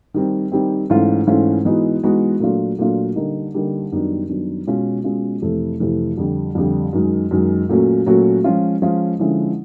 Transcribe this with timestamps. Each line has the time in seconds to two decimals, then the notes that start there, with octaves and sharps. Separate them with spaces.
0.14 D#3 G3 C4
0.52 D#3 G3 C4
0.90 G#2 E3 A3 C#4 F4
1.27 G#2 E3 A3 C#4 F4
1.65 E3 G#3 B3 D#4 F#4
2.03 E3 G#3 B3 D#4 F#4
2.40 A#2 F#3 A3 D4 F4
2.79 A#2 F#3 A3 D4 F4
3.16 D3 G3 A#3 D#4
3.54 D3 G3 A#3 D#4
3.92 F#2 D#3 G3 B3 D4
4.29 F#2 D#3 G3 B3 D4
4.67 B2 G#3 C#4 F4
5.04 B2 G#3 C#4 F4
5.42 F2 C3 E3 A3
5.80 F2 C3 E3 A3
6.18 F2 D3 G3
6.55 F2 D3 G3
6.93 F#2 D#3 G#3
7.31 F#2 D#3 G#3
7.69 A#2 F#3 A3 C#4 F#4
8.06 A#2 F#3 A3 C#4 F#4
8.44 F3 G#3 C#4 F4
8.82 F3 G#3 C#4 F4
9.19 D3 F3 G#3 C#4 E4